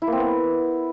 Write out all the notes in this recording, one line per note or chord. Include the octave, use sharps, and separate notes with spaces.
E4
A#3
C4
B3